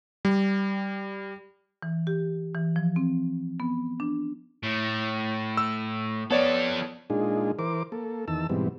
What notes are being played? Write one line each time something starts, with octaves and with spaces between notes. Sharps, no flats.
G3
E3
G4
E3
F3
C4
B3
D4
A2
E6
F3 B3 A4 C#5 D5
A#2 G#3 D4 D#4 F4 G#4
E3 A#4 C5 D6
A#3 A4
E2 D#3 A5 E6
G#2 B2 E3 G3 C4